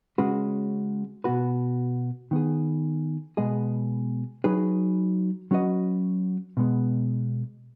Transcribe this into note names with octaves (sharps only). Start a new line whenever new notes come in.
C#3 G#3 C#4 F#4 B4
B2 B3 F#4 B4
D#3 B3 G#4
B2 G#3 B3 G#4 D#5
F#3 D#4 G#4 B4
F#3 C#4 F#4 B4 D#5
B2 G#3 B3